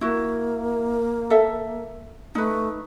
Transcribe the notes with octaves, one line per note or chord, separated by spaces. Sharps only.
A#3 E4 F#4
A4 E5
A3 D#4 B4